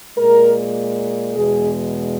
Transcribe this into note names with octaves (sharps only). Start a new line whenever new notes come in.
A#2 G#3 A#4
E2 B2 G#3 G#4